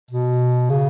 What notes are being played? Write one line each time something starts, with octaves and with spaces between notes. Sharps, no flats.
B2
C#3